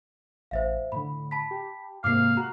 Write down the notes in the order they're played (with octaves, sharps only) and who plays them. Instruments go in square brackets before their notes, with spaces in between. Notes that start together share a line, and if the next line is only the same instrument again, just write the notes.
[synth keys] A1 [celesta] C5 E5 F5
[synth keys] A2 D3 [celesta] B5
[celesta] A5 B5 B6
[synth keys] G4
[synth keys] G#2 C3 A#3 [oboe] F5 [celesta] D6 C7
[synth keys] F#4 F#6 [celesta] A#5